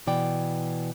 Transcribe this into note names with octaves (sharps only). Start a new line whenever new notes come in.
B2 E3 D5 G5